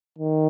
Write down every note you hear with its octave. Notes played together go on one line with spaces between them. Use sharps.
D#3